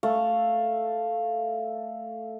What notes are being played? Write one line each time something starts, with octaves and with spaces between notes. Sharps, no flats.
A3 F5